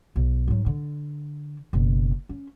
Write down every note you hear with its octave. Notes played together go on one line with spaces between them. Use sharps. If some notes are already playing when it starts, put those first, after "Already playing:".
B1
G#2 F#3
D3
F#1 B2
C#4